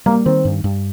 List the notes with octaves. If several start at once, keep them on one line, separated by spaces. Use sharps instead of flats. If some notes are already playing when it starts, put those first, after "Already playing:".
G3 A#3
D#3 C4
G2
G2